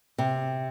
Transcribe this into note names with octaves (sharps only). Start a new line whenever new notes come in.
C3